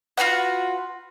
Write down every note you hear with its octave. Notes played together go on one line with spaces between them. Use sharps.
F4 F#4 B4 F#5